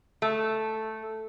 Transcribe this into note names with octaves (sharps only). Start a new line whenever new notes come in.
A3